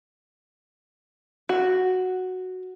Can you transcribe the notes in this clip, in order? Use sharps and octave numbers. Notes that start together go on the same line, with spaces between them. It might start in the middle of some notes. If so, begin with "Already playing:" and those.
F#4